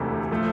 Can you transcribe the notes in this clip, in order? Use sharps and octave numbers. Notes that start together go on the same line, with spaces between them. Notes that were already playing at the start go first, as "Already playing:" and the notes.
Already playing: E1 D2 C3 E3 A3
F3 A3